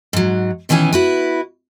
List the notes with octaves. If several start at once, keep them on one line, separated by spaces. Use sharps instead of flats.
G#2 F#3
B2 D#3 E3 C#4 G#5
E4 F#4 B4